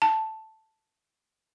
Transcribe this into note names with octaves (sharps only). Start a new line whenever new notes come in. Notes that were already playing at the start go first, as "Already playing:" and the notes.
A5